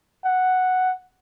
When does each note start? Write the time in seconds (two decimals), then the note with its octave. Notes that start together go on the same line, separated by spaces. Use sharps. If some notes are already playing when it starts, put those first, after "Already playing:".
0.25 F#5